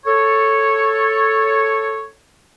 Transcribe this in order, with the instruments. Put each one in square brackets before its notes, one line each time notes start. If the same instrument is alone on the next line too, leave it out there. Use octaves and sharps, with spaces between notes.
[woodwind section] A4 C#5